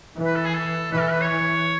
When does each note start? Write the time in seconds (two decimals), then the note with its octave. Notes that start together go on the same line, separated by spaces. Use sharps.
0.17 E3
0.25 B4
0.36 A4
0.45 G#4
0.54 A4
0.92 E3 B4
1.01 A4
1.10 B4
1.21 C#5